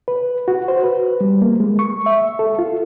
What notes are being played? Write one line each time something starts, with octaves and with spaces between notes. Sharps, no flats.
B4
F#4
C5
B4
G3
A#3
G#3
C#6
E5
A4
F4